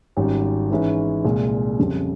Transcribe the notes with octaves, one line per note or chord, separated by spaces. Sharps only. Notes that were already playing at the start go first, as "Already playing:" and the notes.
G#1 G#2 G3 C#4
G#2 E3 G#3 C#4 E4
C2 A#2 G#3
F2 C#3 G3